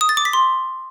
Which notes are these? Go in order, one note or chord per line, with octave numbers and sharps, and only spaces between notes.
D#6
A6
D6
B6
C6